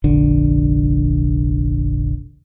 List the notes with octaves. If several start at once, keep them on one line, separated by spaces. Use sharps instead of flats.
F1 A#1 D3